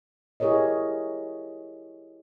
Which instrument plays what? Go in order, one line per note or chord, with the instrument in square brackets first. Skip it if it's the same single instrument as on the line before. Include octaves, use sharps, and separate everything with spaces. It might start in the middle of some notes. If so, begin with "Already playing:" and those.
[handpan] E4 G4 G#4 A#4 C#5 D#5